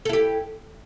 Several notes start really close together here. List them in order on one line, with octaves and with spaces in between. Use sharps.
A4 E4 G4